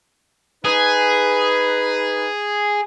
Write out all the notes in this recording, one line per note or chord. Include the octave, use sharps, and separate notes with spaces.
D#4 G#4 B4